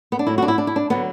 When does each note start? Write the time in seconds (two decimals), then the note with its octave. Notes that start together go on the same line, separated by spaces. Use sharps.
0.12 B3
0.19 D4
0.26 A2 F#3 E4
0.38 F#4
0.42 D4
0.48 E4
0.58 D4
0.67 E4
0.76 D4
0.90 D3 F#3 B3